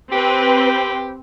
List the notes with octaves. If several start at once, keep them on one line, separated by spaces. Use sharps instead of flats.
C4 G4 B4